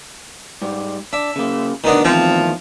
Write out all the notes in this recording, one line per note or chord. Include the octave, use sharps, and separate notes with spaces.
G#2 G3
D4 E5
C#3 A#3
D2 B2 D#3 B3 D4 D#5
E2 A2 D#3 F3 C4 A#5